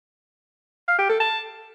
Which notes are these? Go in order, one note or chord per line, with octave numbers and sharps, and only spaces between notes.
F5
G4
A4
A5